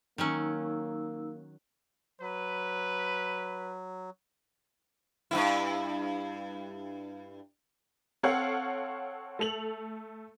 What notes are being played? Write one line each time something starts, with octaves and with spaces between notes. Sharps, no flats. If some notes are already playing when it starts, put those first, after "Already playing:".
D#3 F#3 A#3 C#4 D#4 E6
F#3 B4
G2 A#2 E4
C4 A4 C#5 F5 F#5
A3 A4 F7 F#7